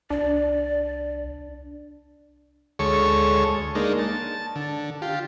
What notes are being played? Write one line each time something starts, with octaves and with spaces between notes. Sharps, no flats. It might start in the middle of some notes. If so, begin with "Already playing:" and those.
C2 D4 D5
D2 G#3 A4 C#5 C#6
G#3 A#3 D4 D#4
A5
D3
F4 G4